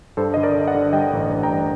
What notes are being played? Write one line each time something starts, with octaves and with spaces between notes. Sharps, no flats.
G2 A4 C5
D3 D#5
A#4 D5
D3
D5 F#5
D3
G3 D#5 G5
A1
A1
G5 A#5
G2